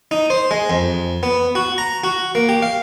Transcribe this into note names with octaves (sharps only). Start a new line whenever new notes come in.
D#4
C5
G#3
F2
B3
F#4
A#5
F#4
A#3
G4
F5